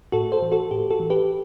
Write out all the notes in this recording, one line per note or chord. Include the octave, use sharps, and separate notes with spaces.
A2 F#4 A4
A4 C5
E3
F#4 A4
A2 G4
F#4 A4
E3
G4 B4